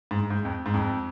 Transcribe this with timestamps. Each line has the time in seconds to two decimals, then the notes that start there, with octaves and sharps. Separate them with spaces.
0.11 G#2
0.30 G#2
0.45 F2
0.66 G#2
0.74 F2